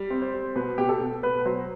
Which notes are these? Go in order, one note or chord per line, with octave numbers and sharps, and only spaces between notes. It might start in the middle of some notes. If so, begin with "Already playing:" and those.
Already playing: G3
C4
C5
G3
B2 B4
B2 G4
A4
B2
B3 B4
F#3 C5